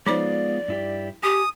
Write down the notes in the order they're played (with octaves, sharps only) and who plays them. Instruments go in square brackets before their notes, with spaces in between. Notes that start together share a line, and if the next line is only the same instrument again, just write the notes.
[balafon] F3 D#4 C5 [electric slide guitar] G#3 B3 F4 [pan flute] D5
[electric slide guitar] G2 E4 G4
[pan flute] G4 [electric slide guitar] G#5 [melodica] D#6